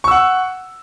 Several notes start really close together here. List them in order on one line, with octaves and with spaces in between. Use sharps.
C#6 E6 F#5